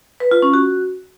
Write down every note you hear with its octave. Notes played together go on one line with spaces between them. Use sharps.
B4
F4
C#4
F#4